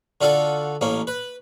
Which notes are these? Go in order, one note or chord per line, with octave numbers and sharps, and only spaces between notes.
D3 F4 F#4 A4
A1 A#3 C#4
B4